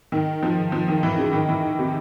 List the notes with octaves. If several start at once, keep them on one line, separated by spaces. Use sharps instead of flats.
D#3
F3
F3
D#3
E3
C#3
D#3
E3
C3